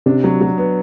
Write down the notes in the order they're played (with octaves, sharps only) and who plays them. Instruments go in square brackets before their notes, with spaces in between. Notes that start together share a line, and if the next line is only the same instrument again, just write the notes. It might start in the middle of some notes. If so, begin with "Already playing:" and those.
[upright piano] C3 [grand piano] D4
[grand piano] F#3
F#3
B3